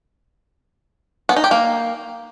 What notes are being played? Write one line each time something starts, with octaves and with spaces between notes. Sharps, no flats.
B3
D#4
G4
A#3